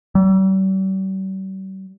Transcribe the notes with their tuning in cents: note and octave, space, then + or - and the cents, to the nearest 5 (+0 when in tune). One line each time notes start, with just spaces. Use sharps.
G3 -45